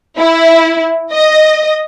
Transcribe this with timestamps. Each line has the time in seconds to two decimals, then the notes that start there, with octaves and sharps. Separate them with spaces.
0.17 E4
1.11 D#5